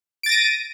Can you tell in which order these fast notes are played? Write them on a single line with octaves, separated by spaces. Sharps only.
D7 A6 A#6 D#7